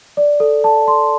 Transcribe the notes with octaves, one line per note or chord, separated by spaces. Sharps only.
D5
A4
A5
C6